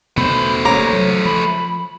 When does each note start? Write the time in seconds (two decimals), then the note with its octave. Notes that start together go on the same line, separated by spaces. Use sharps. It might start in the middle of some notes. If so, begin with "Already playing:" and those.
0.17 B2 A3 C5 B5
0.65 D1 A#3 C#4 C#5 A#5 D6
0.93 F#3
1.25 F3 B5